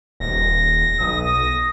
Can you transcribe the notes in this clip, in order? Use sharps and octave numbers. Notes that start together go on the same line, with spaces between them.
D#1 A#6
B1 D#6